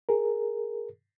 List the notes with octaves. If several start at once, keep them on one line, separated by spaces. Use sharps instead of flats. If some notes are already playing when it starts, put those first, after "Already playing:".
G#4 A#4